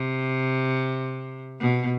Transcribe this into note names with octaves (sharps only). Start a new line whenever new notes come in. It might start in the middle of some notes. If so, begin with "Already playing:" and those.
Already playing: C3
B2